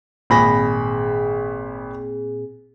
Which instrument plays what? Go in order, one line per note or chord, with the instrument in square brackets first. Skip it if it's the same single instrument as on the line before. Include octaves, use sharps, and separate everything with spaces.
[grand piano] G#1 B5 A#6 [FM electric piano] A#2 C4 G#4